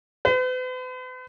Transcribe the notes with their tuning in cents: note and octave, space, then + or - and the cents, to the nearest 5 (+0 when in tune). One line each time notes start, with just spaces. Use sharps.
B4 +45